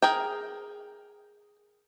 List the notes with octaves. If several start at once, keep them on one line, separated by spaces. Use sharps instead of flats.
G#4 A#4 G5